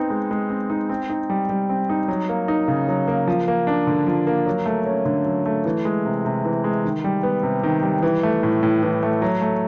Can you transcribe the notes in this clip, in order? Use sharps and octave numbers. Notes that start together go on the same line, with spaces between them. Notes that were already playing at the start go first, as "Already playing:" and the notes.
Already playing: B3 C4 D#4
G#3
G#3
C4
D#4
C4
D#4
G3
G3
C4
D#4
F#3
A#3
D#4
C#3
F#3
A#3
F3
A#3
D4
D3
F3
A#3
F#3
A3
C#4
D3
F#3
A3
E3
G#3
C3
C3
E3
G#3
D#3
G3
B3
C3
D#3
G3
E3
A3
A2
A2
E3
A3
F#3
A3